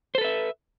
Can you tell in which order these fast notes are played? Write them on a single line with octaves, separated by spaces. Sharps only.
C5 A4 B4 E5